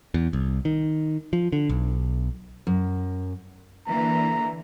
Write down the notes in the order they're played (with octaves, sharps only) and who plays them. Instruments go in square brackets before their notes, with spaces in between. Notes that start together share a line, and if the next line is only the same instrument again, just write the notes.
[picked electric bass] E2
C2
D#3
F3
D3
B1
[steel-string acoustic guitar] F#2
[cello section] D3 E3 A#3 [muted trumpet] A#5